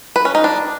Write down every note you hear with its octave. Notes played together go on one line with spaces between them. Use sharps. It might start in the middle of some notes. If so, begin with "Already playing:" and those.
B4
C#4
D#4
D4